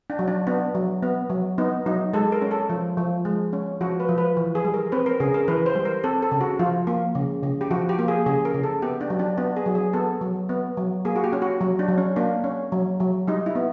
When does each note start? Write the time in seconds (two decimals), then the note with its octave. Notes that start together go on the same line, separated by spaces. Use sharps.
0.10 D4
0.19 F#3
0.28 D4
0.47 B3 D4
0.75 F#3
1.03 B3
1.30 F#3
1.58 B3 D#4
1.86 F#3 D#4
2.13 G#3 A4
2.32 A#4
2.42 C#4
2.51 A4
2.70 F3
2.97 F3
3.25 G#3
3.53 C#4
3.81 F3 F#4
4.00 B4
4.09 F3
4.18 B4
4.37 E3
4.55 G#4
4.65 G3
4.74 A#4
4.92 C4 B4
5.06 A#4
5.20 C#3 G#4
5.34 A#4
5.48 E3 B4
5.66 C5
5.76 G3
5.85 A#4
6.04 C4 A4
6.22 A4
6.32 C#3
6.41 F#4
6.59 F3 F4
6.87 A#3
7.15 C#3
7.43 C#3
7.61 G4
7.71 F3 F#4
7.89 G4
7.99 A#3
8.08 G#4
8.26 C#3 G#4
8.45 A#4
8.54 C#3
8.63 A4
8.82 B3 G4
9.01 D4
9.10 F#3
9.19 D4
9.38 B3 D4
9.57 G#4
9.66 F#3
9.75 G#4
9.93 B3 A4
10.21 F#3
10.49 B3
10.77 F#3
11.05 A#3 G#4
11.16 F#4
11.24 G4
11.33 C#4
11.42 F#4
11.61 F#3
11.79 D4
11.88 F#3
11.98 C#4
12.16 A#3 D4
12.44 C#4
12.72 F#3
13.00 F#3
13.28 G3 D#4
13.46 E4
13.55 B3